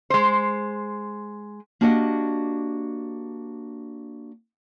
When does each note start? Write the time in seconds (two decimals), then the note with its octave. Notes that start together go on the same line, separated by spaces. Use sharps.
0.10 G#3 C5
1.81 A#3 D4 F#4 G4 D#5 F#5